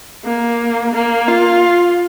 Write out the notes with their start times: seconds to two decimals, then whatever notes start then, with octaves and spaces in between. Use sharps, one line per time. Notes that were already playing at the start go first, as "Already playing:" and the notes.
0.24 A#3
0.94 A#3
1.28 F4